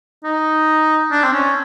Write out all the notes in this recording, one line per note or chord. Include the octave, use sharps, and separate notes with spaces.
D#4
D4
C4
C#4